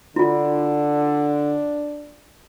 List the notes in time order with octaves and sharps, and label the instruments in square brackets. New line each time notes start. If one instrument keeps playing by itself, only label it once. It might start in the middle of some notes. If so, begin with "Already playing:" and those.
[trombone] D3 [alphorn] D4 [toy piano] E4 F4